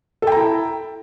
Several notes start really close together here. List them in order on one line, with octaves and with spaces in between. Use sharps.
A4 G5 A#5 E4